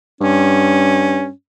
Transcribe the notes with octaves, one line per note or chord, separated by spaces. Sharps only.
G2 C#4